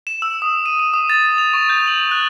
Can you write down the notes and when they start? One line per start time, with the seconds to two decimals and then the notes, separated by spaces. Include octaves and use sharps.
0.07 E7
0.22 E6
0.42 D#6
0.66 D#7
0.79 D#7
0.94 D#6
1.10 A6
1.38 F7
1.53 C#6
1.70 G6
1.87 F#7
2.11 F#6